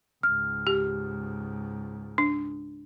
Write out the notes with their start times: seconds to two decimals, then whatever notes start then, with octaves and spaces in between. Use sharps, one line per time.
0.23 C#2 G#2 F6
0.67 G4
2.18 D4